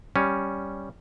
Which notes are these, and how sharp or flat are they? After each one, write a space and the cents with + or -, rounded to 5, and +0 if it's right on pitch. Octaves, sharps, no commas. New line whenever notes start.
G3 +0 C#4 +0